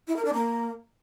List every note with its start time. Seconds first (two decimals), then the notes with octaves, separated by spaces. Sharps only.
0.07 E4
0.16 A#4
0.25 D4
0.33 A#3